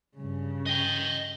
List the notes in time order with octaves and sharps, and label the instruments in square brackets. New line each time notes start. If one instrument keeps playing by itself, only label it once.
[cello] G2 C#3
[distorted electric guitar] D#5 G5